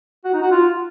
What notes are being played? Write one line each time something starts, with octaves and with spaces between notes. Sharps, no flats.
F#4
D#4
F#4
F4